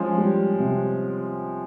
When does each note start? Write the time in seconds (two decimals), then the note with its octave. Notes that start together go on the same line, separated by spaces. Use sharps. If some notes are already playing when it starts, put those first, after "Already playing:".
Already playing: F3 G#3 C#4
0.18 G3
0.59 C3